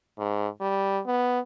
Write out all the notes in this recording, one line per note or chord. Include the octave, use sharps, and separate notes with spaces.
G#2
G3
B3